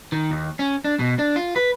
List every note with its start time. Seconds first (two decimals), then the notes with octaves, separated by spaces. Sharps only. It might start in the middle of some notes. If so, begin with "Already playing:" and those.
0.12 D#3
0.31 D#2
0.59 C#4
0.84 D4
0.99 B2
1.19 D4
1.36 F4
1.56 B4